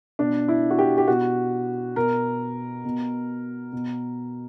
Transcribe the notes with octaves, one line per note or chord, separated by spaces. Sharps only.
B2 D4
E4
F#4
G4
G4
B2 F#4
B2 A#4
B2
B2